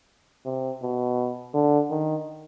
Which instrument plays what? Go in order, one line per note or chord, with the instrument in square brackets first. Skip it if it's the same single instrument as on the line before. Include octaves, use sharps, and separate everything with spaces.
[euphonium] C3
B2
D3
D#3